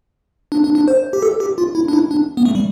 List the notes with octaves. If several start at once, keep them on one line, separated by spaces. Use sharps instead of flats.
D4
D4
D4
C5
G4
A4
G4
F4
E4
D4
E4
D4
B3
A3
G3